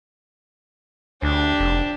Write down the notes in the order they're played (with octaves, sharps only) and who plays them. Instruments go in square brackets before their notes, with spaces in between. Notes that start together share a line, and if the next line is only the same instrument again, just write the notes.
[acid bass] D2 [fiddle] D4 G4
[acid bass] F1